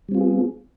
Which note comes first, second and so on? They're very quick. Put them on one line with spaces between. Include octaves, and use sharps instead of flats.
G3 C4 F4 B3 G#4